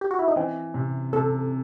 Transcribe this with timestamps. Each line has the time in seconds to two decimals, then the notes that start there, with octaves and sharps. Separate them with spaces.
0.01 G4
0.11 F#4
0.19 E4
0.28 D#4
0.36 E3 C4
0.74 C3
1.13 C3 A4